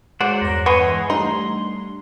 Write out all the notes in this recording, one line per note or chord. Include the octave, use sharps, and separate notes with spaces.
F#3 G#3 C5 D5 F#5
E2 G2 A#4 C#5
B3 G#5 C6 C#6
E3 G#3
G3 A3 D4 D#4 C6